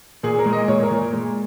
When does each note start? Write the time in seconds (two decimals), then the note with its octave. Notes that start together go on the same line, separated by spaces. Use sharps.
0.23 A#2 G#4
0.39 A#4
0.46 G#3
0.53 D#5
0.68 A#2 C#5
0.83 A#4
0.91 A#2
1.13 G#3